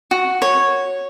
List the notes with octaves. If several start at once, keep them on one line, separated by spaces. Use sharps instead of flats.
F#4
C#5